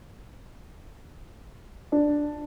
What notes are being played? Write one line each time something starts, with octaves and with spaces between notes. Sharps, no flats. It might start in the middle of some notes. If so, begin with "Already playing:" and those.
D4